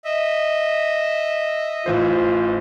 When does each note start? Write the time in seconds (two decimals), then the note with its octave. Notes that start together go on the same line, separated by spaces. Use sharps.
0.05 D#5 E5
1.86 A1 E3 F4 C5